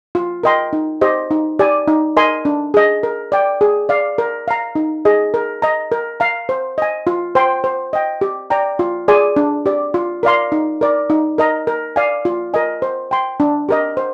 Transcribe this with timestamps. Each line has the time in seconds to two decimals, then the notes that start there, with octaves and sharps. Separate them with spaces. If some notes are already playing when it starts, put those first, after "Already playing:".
0.15 F4
0.43 A#4 D#5 G5 C6
0.73 D#4
1.01 G4 C5 D#5
1.31 D#4
1.59 G4 D5 G#5
1.88 D#4
2.17 A#4 D#5 G#5 C6
2.45 D4
2.74 G#4 D#5
3.03 A#4
3.32 D5 G5
3.61 G#4
3.89 D5 F5
4.18 A#4
4.48 F5 A#5
4.75 D#4
5.05 G#4 D#5
5.34 A#4
5.62 D#5 A#5
5.92 A#4
6.20 F5 A#5
6.49 C5
6.78 D#5 G#5
7.07 F4
7.35 C5 G5 C6
7.64 C5
7.93 D#5 G5
8.21 G4
8.50 D5 G5 A#5
8.79 F4
9.08 G#4 D5 G#5 C6
9.36 D4
9.66 G4 D5
9.94 F4
10.23 A#4 D5 F5 C6
10.52 D#4
10.81 A#4 D5
11.10 D#4
11.38 A#4 D#5 A#5
11.67 A#4
11.96 D5 F5 G#5
12.25 F4
12.54 A#4 D#5 G#5
12.82 C5
13.11 G5 C6
13.40 D4
13.69 G4 A#4 D#5
13.97 C5